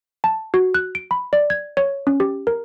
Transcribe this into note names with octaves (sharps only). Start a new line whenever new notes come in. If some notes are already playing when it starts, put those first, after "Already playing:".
A5
F#4
F#6
D7
B5
D5
G#6
C#5
C#4
G4
A#4